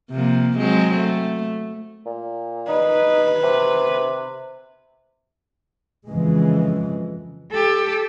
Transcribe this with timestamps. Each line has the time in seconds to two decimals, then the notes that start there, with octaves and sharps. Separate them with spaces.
0.11 C3 F3 A#3
0.58 F#3 G#3 C4
0.96 A3
2.06 A#2
2.68 D#4 B4
3.44 C3
6.08 F2 C#3 E3 G#3
7.51 G4 A4